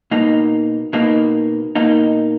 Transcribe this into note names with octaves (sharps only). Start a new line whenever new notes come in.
B2 A#3 D#4
B2 A#3 D#4
B2 A#3 D#4